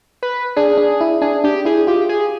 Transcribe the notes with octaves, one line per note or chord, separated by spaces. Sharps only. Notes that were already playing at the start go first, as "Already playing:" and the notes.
B4
D4 G#4
D4
E4
D4 G#4
D4 G4
E4 G#4
F4 G4
G#4